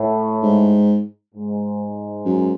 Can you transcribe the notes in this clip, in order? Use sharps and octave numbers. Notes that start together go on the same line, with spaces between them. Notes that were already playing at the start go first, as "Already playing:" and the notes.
Already playing: A2
G#2
G#2
F#2